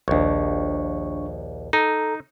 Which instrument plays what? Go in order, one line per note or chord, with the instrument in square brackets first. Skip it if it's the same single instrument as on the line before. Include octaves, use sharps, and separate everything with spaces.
[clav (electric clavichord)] A#1 D#2 [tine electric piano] D4 C#6
[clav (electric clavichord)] D#4 [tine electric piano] A4 A#5